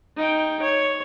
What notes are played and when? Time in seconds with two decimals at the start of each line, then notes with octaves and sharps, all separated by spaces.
0.16 D#4 G5
0.62 C#5